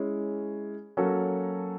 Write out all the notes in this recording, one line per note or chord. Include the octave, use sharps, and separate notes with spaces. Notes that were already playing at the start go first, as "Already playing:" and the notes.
Already playing: G#3 C#4 E4
F#3 A#3 C#4 F#4 A4